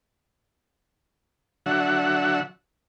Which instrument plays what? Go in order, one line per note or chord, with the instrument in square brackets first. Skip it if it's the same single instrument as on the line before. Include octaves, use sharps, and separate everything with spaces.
[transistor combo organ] D3 F#3 E5 F#5